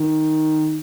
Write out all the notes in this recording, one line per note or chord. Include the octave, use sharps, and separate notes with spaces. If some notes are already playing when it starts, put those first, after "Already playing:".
Already playing: D#3